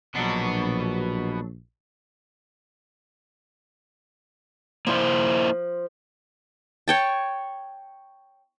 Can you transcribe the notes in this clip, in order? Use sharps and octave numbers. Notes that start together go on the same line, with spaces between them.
A#1 B2 F#3 B3 D4
F3 A#3 E4 C5
C#5 G5 A5